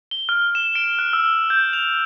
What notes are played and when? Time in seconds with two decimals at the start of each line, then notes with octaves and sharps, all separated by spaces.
0.11 G7
0.29 F6
0.55 E7
0.75 D7
0.99 F#6
1.13 E6
1.50 G6
1.73 F7